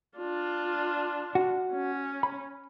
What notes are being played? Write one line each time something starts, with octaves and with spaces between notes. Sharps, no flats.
D4 F4
F#4
C#4
B5